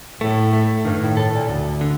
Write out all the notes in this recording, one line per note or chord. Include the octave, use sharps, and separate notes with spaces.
A2 A3
A3
G2 D#3
A2
A2 A4
A#2
D2
D3